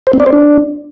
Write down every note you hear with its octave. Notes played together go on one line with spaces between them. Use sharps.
C5
C4
D5
C5
D4